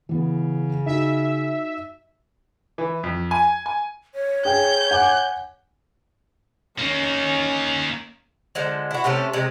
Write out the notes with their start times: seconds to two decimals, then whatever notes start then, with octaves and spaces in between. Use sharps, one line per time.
0.09 C#3 E3 B3
0.86 D#4 F#4 E5
2.78 E3
3.03 F2
3.31 G#5
3.66 G#5
4.15 C#5
4.45 G#4 G5 G6
4.91 F#5 G#5 D6
6.79 A#3 C#4 D#4
8.55 D3 F3 G#3
8.91 E4 F#4
9.04 C3 A3 C#4 A4
9.33 C3 G#3